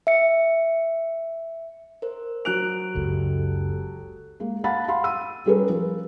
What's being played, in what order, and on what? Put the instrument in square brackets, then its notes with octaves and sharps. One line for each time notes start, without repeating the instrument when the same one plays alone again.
[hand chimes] E5 C#7
A#4 C5
[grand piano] F#3 F#6 F7 [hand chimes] D7
[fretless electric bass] F#1 C#2 [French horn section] G4 A4
[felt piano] G#3 A#3
F5 F#5 A5 B5 A6
F5 B5 C6
E6 D#7
G3 C#4 G#4 A#4 B4
F3